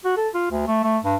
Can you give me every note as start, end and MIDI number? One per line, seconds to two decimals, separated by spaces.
0.05 0.14 66
0.17 0.29 69
0.34 0.51 65
0.51 0.64 38
0.68 0.81 57
0.84 0.98 57
1.03 1.16 43